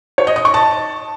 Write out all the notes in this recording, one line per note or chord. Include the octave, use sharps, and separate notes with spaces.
C#5
D#5
D#6
C#6
A5